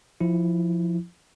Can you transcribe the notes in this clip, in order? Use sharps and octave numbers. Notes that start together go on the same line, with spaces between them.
F3 E4